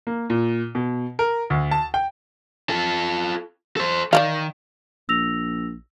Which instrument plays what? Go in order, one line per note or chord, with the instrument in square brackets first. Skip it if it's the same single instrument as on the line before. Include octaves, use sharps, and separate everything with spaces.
[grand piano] A#3
A#2
B2
A#4
D2
A5
G5
[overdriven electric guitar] F4 A4
A4 C5
[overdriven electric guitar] D#3 [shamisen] D5 D#5 F5
[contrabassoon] A#1 [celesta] E6 A#6 F7